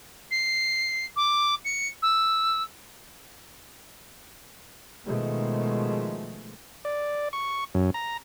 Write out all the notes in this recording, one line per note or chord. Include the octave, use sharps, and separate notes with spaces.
C7
D6
C#7
E6
B2 D#3 F3 G#3 A3
D5
C#6
F#2
A#5